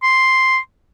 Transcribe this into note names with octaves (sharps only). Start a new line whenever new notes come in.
C6